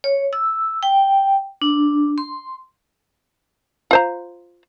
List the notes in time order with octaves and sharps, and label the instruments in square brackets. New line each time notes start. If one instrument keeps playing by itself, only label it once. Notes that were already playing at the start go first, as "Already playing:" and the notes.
[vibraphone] C#5
E6
G5
D4
C6
[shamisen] F4 C5 A#5